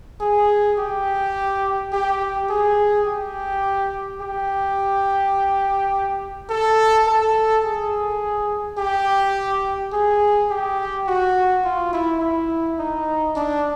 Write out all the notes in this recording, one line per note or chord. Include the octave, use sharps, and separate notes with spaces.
G#4
G4
G4
G#4
G4
G4
A4
A4
G#4
G4
G#4
G4
F#4
F4
E4
E4
D#4
D4